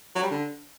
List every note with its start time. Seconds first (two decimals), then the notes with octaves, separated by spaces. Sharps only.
0.16 F#3
0.23 G3
0.30 D3